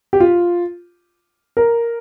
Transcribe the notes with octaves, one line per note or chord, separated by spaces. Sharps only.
G4
F4
A#4